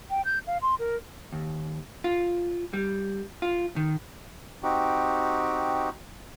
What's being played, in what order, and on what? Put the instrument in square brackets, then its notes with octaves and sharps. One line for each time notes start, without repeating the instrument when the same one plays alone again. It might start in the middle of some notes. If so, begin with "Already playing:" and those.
[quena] G5
G6
F5
C6
A#4
[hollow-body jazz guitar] D#2
F4
G3
F4
D#3
[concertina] C4 D#4 F#4 G4